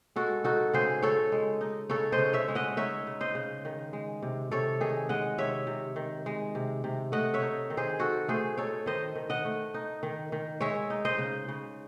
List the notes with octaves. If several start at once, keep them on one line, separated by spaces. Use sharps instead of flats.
G#3 F#4 A4
D#4 F#4 A4
C#3 G#4 C5
C#3 A4 C#5
G#3
D#4
C#3 A4 C#5
C5 D#5
C#3
C#5 E5
G#3
D#5 F#5
D#4 C#5 E5
C#3
C5 D#5
C#3
D#3
G#3
C3
C3 A4 C#5
D#3 G#4
G#3 D#5 F#5
C3 C#5 E5
C3
D#3
G#3
C3
C3
A3 D#5 F#5
C#5 E5
D#4
D#3
G#4 C5
D#3 F#4 A4
A3 G#4 C5
D#4 A4 C#5
D#3 C5 D#5
D#3
D#5 F#5
A3
D#4
D#3
D#3
G#3 C#5 E5
D#4
C5 D#5
C#3
C#3